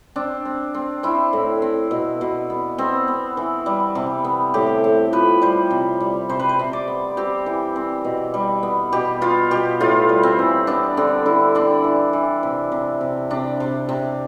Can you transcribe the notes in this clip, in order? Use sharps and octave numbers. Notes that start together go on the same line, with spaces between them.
C4 D4
C4
C4
C4 E4
A2
C4
B2
B2
B3
B3 C4
B3
E3
G3
C3
B3
A2 G4
A2
F3 B4
G3 C5
C3
G3
C3 C5
B4
C5
C3
D5
B3
C4 G4
E3
C4
B2
G3
B3
B2 G4
B3 F4
B2 G4
A2 F4
G3
C4
E3
B3 D4
D3 C4
D3 E4
C4 D4
E3
E3
C3
C3
C3
C3 D4
C3
C3